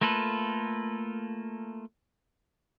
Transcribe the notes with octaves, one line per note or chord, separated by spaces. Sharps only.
A3 A#3 F4 A4 B4